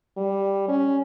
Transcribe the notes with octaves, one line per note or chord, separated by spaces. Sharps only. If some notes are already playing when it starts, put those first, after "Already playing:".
G3
C#4